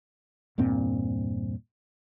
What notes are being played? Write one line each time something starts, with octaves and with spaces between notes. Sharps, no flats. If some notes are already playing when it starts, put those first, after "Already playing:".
E2 G2 A#2 C4